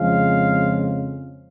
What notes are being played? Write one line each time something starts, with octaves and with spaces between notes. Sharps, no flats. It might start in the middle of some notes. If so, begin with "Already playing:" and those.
Already playing: F2 C#3 F3 G#3 F5